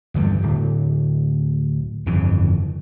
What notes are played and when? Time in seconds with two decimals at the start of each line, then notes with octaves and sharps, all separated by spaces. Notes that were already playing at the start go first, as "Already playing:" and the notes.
0.14 G1 E2 D3 G3
0.43 D1
2.06 G1 F2 C#3 E3